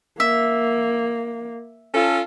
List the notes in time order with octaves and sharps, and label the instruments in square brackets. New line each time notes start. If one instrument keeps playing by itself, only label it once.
[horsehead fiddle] A#3 [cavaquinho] E5
[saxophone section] C#4 F4 A4